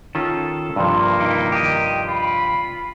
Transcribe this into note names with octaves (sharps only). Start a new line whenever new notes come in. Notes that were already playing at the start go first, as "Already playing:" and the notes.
D#3 C#4 F4 A4
G2 C3 F3 A#3
D#3 D#4 E4
G4 D#5
F4 B5